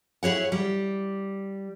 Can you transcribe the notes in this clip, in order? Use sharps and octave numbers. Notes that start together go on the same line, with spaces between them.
E4 G#4 C#5 F#5
G3